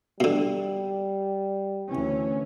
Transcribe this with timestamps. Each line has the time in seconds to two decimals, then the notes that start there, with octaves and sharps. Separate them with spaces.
0.20 B2 D3 G3
1.87 D2 E3 C#4